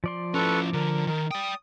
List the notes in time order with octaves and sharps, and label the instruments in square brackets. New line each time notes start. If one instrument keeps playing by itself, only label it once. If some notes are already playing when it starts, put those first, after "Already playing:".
[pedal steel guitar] F3 D5 C6
[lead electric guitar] C#4 E4 [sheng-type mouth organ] A4 B4 C#6
[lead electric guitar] D3 [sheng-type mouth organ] A#4
[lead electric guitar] D#3 [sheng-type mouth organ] A#4
[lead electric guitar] D5 G5 [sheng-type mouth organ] D#6